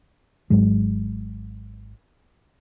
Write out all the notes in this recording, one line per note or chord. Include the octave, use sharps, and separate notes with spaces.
G#1 G#2 F#3 G#3